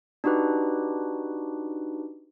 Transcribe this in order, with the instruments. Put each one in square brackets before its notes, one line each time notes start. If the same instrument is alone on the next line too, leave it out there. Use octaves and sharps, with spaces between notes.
[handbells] D4 D#4 F#4 G4 B4